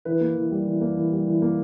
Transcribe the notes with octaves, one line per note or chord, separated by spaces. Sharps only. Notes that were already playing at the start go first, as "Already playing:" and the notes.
E3 B4
A#3
E3
G3
E3
A#3
E3
G3
E3
A#3